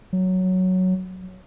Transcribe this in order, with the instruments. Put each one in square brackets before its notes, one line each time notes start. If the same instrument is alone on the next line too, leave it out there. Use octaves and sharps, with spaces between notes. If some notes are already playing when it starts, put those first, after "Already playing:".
[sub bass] F#3